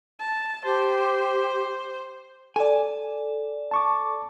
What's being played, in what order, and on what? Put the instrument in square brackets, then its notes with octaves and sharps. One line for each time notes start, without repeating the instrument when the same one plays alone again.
[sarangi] A5
[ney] G4 [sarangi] C5
[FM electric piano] A4 D5 [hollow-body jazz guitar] G#5
[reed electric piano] A5 C#6 D6